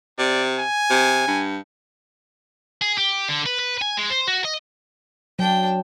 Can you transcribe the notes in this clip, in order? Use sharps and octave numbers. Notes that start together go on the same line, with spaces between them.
C3 D5
G#5
C3
G2
G#4
G4
D3
B4
B4
G#5
G#3
C5
F#4
D#5
F#3 D4 G5